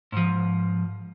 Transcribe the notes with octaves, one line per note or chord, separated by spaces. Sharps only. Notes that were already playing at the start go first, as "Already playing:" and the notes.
G#2 F3